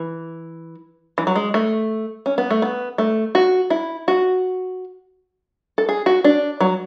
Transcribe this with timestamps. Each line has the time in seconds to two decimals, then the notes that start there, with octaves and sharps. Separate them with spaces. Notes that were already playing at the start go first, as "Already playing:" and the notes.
Already playing: E3
1.18 E3
1.27 F#3
1.36 G#3
1.54 A3
2.26 C#4
2.38 B3
2.51 A3
2.62 B3
2.98 A3
3.35 F#4
3.70 E4
4.08 F#4
5.78 A4
5.89 G#4
6.06 F#4
6.24 D4
6.61 F#3